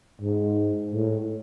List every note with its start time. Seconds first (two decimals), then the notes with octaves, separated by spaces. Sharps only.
0.21 G#2
0.91 A2